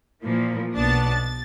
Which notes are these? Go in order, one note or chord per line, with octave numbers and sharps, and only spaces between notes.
A#2 E3 F3 A#3
B1 B3 D4 A5 A6
A6